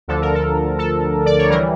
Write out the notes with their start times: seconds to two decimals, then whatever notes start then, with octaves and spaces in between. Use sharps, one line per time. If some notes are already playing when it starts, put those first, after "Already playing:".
0.08 D2 D3 F3 A4
0.22 A#4
0.35 A4
0.79 A4
1.26 D5
1.38 C#5
1.50 E3 G3 A#4